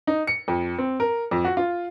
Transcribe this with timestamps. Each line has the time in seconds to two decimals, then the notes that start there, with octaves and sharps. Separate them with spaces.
0.07 D#4
0.27 C#7
0.48 F2
0.78 C4
1.00 A#4
1.31 F2
1.45 F#4
1.57 F4